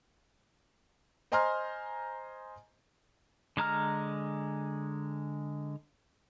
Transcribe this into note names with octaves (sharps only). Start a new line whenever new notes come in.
C5 D#5 G#5 A#5 C6 F6
D3 G#3 A#5 F6